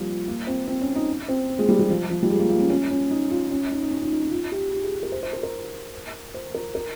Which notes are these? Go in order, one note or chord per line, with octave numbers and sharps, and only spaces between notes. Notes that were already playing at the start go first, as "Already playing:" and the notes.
Already playing: F3 G3 A#3 C4
A#3
C4
C4
C#4
D#4
C4
G#3
G3
G3
F3
F3
G3
G#3
A#3
A#3
C#4
C#4
C#4
D#4
F4
C#4
D#4
D#4
C#4
D#4
D#4
C#4
F4
G4
G4
G#4
A#4
C5
C5
A#4
A#4
C5
A#4
A#4